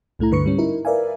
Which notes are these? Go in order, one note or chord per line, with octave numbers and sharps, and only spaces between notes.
C2 A2 A3 E4 A#5
C#2 G2 D3 B4 C#6 C#7
G#2 G3 C#4
D#4 E4 A#4
A#4 B4 D5 E5 F5 G#5